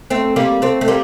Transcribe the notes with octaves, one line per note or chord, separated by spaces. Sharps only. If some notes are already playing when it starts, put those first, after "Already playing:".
A3 C4
G3 A#3
A3 C4
A3
G3 A#3